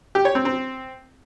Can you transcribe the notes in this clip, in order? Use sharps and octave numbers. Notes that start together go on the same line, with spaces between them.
G4
C#5
C4
C4